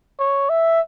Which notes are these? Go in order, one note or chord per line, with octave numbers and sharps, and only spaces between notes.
C#5
E5